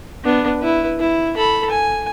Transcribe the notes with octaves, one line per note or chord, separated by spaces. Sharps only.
B3 D4
E4 B4
E4
A4 B5
G#5